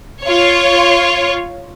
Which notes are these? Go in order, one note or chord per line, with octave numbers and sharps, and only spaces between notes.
F4 C#5